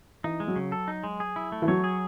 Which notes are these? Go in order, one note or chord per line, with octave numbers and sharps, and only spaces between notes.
E3 D#4
G#3
F#3
C#3
A4
D#4
G#3
G#4
E4
A3
E3
F#3 C#5
G#4